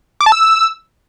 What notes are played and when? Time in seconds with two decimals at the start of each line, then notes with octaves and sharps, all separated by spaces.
0.21 D6
0.26 A5
0.32 E6